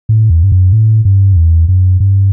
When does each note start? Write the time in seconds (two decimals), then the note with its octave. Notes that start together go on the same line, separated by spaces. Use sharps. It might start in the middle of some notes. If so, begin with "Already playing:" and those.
0.09 A2
0.30 E2
0.43 G2
0.52 F#2
0.72 A2
1.05 G2
1.33 F#2
1.36 E2
1.68 F#2
2.00 G2